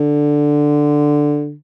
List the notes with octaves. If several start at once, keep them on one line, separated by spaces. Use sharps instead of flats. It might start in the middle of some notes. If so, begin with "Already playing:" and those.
Already playing: D3